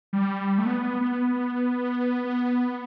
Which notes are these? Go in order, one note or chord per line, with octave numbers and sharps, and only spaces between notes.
G3
A3
B3
B3
B3
B3